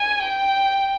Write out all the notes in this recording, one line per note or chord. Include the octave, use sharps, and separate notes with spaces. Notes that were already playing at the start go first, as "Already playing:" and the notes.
Already playing: G#5
G5